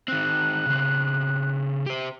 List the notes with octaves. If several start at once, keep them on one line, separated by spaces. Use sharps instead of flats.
D#3 C4 F#6
C#3 C4
G4 C5